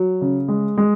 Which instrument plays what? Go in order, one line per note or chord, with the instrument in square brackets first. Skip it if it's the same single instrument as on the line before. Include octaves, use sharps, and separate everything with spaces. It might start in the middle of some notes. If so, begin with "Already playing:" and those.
Already playing: [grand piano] F#3
C#3
G#3
G#3